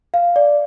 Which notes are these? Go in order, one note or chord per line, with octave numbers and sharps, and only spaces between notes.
F5
D5